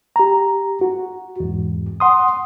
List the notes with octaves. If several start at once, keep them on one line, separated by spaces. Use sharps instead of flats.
G4 A#5
F#4
E2 G#2
F#5 C6 D#6